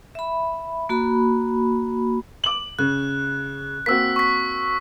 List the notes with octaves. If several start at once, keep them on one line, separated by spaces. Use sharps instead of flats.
E5 B5
A#3 F#4 B5
D6 F#7
C#3 F#6
A#3 C4 F#4 E6 B6
C#6 B6